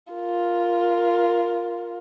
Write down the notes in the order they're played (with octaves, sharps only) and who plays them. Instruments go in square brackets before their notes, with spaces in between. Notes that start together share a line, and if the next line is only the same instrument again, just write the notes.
[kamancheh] F4 A#4